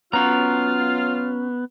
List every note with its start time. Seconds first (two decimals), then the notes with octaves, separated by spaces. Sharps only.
0.13 F#3 B3 C#4 F4 A#5 F6